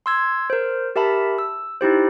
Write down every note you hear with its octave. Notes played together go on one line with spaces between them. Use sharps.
C6 E6 G#6
A#4 C5
G4 A#4 E5 A5 B5
E6
D#4 E4 G4 C5